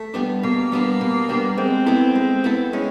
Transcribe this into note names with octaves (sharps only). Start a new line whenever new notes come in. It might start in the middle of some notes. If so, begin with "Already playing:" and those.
Already playing: A3
G3 B3 D4
B2 A#3
G3 B3 D4
B2
G3 B3 D4
G#3 C4
B3 E4 A4
G#3
B3 E4 A4
G#3 C#4